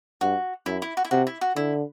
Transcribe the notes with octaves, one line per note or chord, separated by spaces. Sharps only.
G2 F#4
F#2 E4
E4
F#4
E4
C3 F#4
E4
F#4
D3 E4